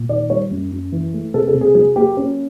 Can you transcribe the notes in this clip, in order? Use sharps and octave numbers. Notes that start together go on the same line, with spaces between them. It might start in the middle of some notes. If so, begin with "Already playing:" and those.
Already playing: A#2
D#3 D5
G3 C#5
F#2
F#2
E3
A3
C3 A4
A4
C3
G#4
F#3 G#4
A#3 G4
C#4